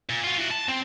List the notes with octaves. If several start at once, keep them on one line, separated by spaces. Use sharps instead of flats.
A#2
F4 F#4
E4 F#4
A5
C4